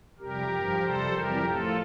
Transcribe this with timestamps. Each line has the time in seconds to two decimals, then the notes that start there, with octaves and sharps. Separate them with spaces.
0.19 F2 C3 G3 G4 A#4
0.51 G2 F3
0.81 F2 C3 G3 A4 C5
1.12 F2 C3 E3 G3 G4 A#4
1.44 A2 F3 F4 A4